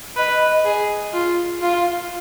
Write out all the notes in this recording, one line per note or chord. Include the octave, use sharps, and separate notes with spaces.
B4 D#5
G#4
F4
F4 F5